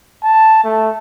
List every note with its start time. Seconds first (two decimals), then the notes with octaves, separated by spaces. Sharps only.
0.24 A5
0.64 A3